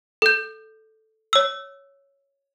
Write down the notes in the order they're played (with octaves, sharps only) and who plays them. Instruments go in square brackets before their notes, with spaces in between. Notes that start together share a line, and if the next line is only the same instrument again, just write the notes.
[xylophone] A4 G6
C#5 E6